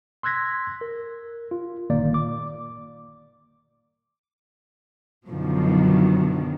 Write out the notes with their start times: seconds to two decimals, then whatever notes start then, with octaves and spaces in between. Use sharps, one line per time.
0.23 C6 E6 F#6 G#6 A#6 B6
0.81 A#4
1.51 F4
1.90 G1 A#2 D#3 A#3 D5
2.14 D6
5.28 F#2 B2 D3 D#3 F3 F#3